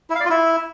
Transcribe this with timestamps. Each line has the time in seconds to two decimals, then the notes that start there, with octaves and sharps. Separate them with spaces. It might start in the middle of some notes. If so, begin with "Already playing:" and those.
0.10 E4
0.15 F5
0.20 D5
0.25 F4
0.30 E4